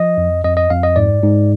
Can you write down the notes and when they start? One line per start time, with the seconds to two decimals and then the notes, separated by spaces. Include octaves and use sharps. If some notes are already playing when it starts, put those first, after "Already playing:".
Already playing: F3 D#5
0.18 F2
0.44 F2 D#5
0.57 D#5
0.70 F2 F5
0.83 D#5
0.96 G#2 D5
1.22 G#2